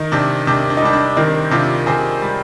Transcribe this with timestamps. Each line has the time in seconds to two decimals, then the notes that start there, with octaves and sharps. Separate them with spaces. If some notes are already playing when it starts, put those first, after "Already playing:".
Already playing: D#3 D#4
0.12 C3 D4
0.47 C3 D4
0.70 D4
0.77 D#4
0.82 G3 D4
0.93 D4
1.16 D#3 C4 D#4
1.51 C3 D4 F4
1.86 C3 G#4 C5
2.22 G3